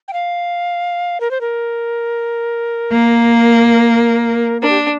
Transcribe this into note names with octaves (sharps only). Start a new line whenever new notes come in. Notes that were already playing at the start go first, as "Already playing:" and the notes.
G5
F5
A#4
C5
A#4
A#3
D4 A#4
G4